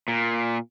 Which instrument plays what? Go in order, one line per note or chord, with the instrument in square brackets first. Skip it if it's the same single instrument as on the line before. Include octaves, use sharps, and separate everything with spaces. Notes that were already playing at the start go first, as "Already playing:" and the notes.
[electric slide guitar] A#2